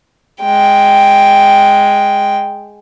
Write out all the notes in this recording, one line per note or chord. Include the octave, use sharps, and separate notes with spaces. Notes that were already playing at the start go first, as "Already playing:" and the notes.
G#3 G5